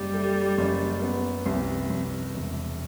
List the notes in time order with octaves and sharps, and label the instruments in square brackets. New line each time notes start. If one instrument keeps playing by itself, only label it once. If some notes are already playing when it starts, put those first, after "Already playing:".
Already playing: [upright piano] F#1 [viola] G3
[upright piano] A3
F#1
B3
C2
C2
E1